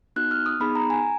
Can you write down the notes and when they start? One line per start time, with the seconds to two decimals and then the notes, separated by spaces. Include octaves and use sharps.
0.16 B3 D#4 F#4 F#6
0.31 F6
0.46 D#6
0.60 B3 D#4 G#4 B5
0.75 A#5
0.90 G#5